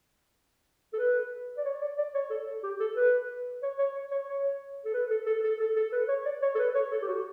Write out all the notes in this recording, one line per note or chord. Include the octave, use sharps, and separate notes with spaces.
A4
B4
D5
C#5
D5
D5
C#5
A4
G4
A4
B4
C#5
C#5
C#5
C#5
A4
B4
A4
A4
A4
A4
A4
B4
C#5
D5
C#5
A4
B4
C#5
A4
G4
F#4